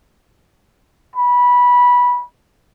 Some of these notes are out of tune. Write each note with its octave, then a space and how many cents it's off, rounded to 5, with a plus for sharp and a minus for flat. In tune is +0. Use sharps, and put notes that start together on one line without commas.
B5 -15